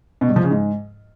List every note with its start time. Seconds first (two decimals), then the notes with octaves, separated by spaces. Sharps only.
0.21 B2
0.29 G2
0.36 F3
0.44 C#3
0.51 G#2